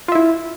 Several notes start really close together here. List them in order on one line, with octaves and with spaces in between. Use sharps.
F4 E5 E4